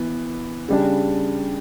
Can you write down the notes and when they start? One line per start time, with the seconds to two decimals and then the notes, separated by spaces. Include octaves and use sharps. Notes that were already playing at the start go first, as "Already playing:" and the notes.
Already playing: E3 B3
0.68 C#3 G3 D4